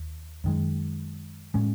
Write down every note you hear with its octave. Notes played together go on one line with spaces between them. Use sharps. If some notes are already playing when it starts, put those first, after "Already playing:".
Already playing: D#2
F#2 D#3 G#3
A2 G#3 C#4